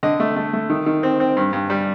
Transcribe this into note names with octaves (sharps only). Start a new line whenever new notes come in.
D3 D#5
A3
A3
A3
D#3
D#3
C4
C4
G2
G2
G3